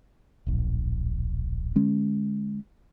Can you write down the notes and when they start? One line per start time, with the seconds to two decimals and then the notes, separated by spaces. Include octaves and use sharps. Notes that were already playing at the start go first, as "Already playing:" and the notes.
0.47 D1 A#1
1.75 D3 G#3 C#4